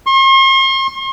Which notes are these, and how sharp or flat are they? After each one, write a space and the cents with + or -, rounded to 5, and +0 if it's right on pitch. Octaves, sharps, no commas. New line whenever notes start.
C6 +45